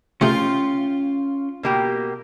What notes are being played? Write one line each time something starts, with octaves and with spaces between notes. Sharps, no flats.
C3 A3 C#4 F4 G#4 G5 C6
B2 A#3 G4